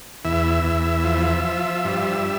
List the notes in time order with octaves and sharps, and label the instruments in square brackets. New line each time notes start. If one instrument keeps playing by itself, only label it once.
[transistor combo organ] E2 E5
E2
F3
F3
G2